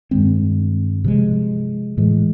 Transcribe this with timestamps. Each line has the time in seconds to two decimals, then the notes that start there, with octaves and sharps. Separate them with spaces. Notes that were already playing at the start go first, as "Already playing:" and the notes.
0.11 G2 D#3 G#3 C4
1.04 C3 F3 G#3
1.98 A2 E3 G#3